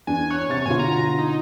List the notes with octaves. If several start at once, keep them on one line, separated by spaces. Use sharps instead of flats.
E2 D4 G#5
C#5 F#6
C3 C#6 A6
B2 D3 F4 G#5
A#5
D#4